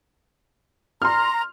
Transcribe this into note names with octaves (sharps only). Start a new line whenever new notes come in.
A#5 C6 F6